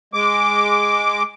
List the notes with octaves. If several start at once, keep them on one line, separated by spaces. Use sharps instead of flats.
G#3 D6